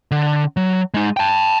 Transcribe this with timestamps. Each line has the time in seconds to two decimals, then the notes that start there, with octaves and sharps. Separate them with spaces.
0.11 D3
0.57 F#3
0.94 G#3 D#4
1.17 G5 A5